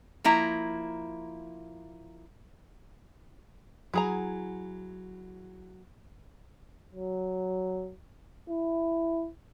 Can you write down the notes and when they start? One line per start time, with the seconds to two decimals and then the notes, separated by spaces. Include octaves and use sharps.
0.24 F3 A#3 E4 A#5
3.94 F#3 E4 G#4 A#5
6.93 F#3
8.49 E4